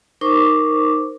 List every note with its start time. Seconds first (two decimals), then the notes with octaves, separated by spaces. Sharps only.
0.21 D#4 A#4 C5 C#6 D6